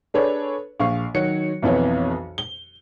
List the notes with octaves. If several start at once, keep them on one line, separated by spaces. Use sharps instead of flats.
D4 G#4 A4 B4 C#5 D5
A#1 F5 C#6
D#3 F#3 F#4 C#5 C#7
B1 F2 E3 B3 C#5
G7